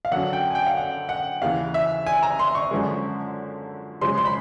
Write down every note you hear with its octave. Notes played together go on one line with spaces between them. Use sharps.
F5
F#2 D3 F#3 F#5
G5
G#5
G5
F5
F#5
F#5
D#2 C#3 E3 F5
E5
G#5
A#5
C6
C#6
F#2 D3 F3 G#3
F#2 C#3 F3 G#3 C6
C6
B5